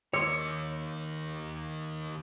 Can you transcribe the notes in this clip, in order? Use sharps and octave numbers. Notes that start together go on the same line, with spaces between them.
D#3 A#3 C#5 C6 D6 E6 C#7